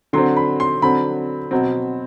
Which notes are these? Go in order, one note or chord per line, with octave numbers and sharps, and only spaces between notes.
D3 F#3 C4 C6
B5
C6
D3 F#3 C4 B5
B2 F#3 C4